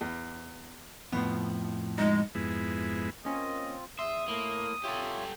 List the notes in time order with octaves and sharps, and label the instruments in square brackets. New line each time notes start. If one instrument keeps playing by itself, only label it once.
[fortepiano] E2
[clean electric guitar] F2 A2 F3 [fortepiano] B3
[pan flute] G#3 [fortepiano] D#4
[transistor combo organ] F2 G#2 G#3 B3 E4
[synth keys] A#3 C#4 [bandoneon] C4 F4 [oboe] D#5
[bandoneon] E2 [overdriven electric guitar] E5 [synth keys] C6 [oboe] D#6
[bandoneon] A2 A3 E4 [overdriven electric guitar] A#3
[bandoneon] F4 C#5 E5 [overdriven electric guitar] G4 A4